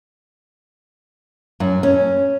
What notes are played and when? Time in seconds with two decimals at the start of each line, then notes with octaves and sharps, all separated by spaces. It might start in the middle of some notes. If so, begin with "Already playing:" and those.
1.60 F#2
1.83 C#4